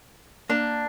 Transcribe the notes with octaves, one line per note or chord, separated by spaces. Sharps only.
A#3 D4